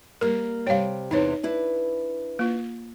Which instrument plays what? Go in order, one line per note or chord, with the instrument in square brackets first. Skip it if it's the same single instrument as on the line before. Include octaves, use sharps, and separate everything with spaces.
[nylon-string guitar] G3 A#3 [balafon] A#4
[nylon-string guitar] C3 G3 G5 [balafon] C#5 F5
[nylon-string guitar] E2 C3 E3 [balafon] D#4 C#5
[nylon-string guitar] D4 E4 B4
[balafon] A#3 F4